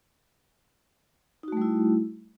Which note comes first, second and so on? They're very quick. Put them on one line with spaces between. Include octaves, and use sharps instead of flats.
D#4 F#4 A3 G3 E4